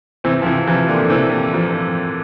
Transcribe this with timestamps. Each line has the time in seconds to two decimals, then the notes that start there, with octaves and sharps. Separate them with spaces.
0.24 C3 E3 C4
0.42 F3
0.46 C3 E3
0.68 C3 E3 F3
0.89 A#2 D3
1.10 C3 E3 C4
1.54 F3